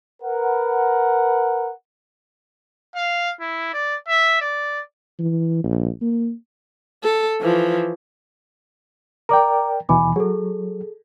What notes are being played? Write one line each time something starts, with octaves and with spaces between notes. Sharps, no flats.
A#4 B4 F#5
F5
E4
D5
E5
D5
E3
A#1
A#3
A4
E3 F3
A#4 D5 G5 A#5 D6
D#2 B2 E3 G#5 B5 D6
F#3 G#4 A4